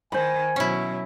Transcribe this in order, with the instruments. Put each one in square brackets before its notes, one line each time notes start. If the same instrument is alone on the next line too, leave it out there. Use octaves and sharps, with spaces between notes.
[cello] D#3 [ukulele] C5 B5 [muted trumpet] G#5
[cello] B2 F#3 [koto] C#4 E4